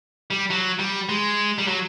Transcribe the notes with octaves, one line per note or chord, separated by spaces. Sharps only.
G3
F#3
G3
G#3
G3
F#3